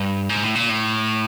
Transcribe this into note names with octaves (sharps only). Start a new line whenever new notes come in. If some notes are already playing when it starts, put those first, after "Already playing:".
Already playing: G2
G#2
A2
A#2
A2